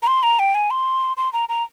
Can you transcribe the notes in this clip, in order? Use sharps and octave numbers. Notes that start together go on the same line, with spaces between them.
A#5
C6
A#5
G5
G#5
C6
C6
A#5
A#5